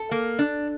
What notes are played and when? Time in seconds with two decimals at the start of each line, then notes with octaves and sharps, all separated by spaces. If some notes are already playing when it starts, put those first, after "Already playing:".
Already playing: A4
0.11 A#3
0.39 D4